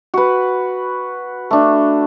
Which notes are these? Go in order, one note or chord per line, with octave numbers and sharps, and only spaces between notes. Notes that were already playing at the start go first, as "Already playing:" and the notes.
F#4 B4
A3 D4